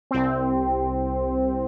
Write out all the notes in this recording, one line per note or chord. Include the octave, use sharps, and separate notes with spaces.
C2 C4